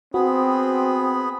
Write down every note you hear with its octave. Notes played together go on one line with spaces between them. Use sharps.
B3 C4 F#4 G#4 B5